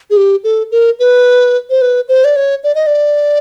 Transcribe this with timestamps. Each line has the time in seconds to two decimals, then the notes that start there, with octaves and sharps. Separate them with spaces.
0.10 G#4
0.17 G4
0.44 A4
0.71 A#4
0.99 B4
1.70 C5
1.82 B4
2.08 C5
2.25 D5
2.36 C#5
2.64 D5
2.75 D#5
2.87 D5